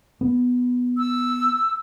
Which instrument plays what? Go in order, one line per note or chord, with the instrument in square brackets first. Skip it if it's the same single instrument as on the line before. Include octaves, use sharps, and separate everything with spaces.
[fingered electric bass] B3
[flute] E6